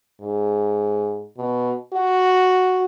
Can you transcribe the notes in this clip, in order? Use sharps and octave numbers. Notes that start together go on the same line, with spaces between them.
G#2
B2
F#4